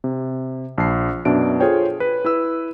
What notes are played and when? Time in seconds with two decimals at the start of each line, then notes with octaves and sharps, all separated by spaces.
0.04 C3
0.78 A#1 A5 C7
1.25 F#2 B2 D4 E5 D7
1.60 F4 G#4 A4 C5 C#5 G5
2.00 B4
2.25 E4 B4 E6